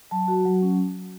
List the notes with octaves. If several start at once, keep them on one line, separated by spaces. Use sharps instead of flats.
F#3 A5
F#4
F#3
C#4